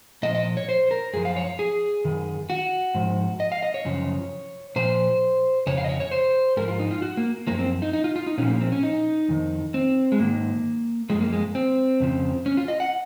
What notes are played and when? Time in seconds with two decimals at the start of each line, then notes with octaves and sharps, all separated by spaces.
0.23 A#2 F3 D#5
0.35 D#5
0.57 C#5
0.69 C5
0.91 A#4
1.13 F#2 F3 G#4
1.25 F5
1.36 C#5
1.59 G#4
2.05 F#2 D#3
2.50 F#4
2.95 G#2 F3
3.40 D#5
3.52 F5
3.63 D#5
3.74 C#5
3.85 F#2 C#3 F3
4.76 A#2 F3 C5
5.67 F2 C#3 C#5
5.78 F5
5.84 D#5
5.89 C#5
6.00 C#5
6.12 C5
6.57 G#2 F3 A#4
6.68 F4
6.80 D#4
6.91 F4
7.02 F#4
7.17 A#3
7.47 F#2 F3 A#3
7.59 C4
7.82 D#4
7.93 D#4
8.04 F4
8.16 F4
8.26 D#4
8.38 A#2 F3 C#4
8.50 A#3
8.61 C4
8.72 C#4
8.83 D#4
9.29 F2 D#3
9.74 C4
10.12 G#3
10.19 G#2 D#3 A#3
11.10 F#2 F3 G#3
11.21 A#3
11.32 G#3
11.55 C4
12.00 F2 C#3 F3
12.46 C#4
12.57 F4
12.68 D#5
12.80 F#5